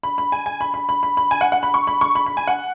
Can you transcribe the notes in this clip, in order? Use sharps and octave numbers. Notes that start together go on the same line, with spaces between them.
B5
B5
G#5
G#5
B5
B5
B5
B5
B5
G#5
F#5
F#5
B5
C#6
B5
C#6
B5
B5
G#5
F#5